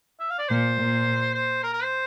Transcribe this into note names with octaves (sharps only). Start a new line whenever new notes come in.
E5
F5
D5
A#2 C5
A#2
C5
A#4
A#4
C5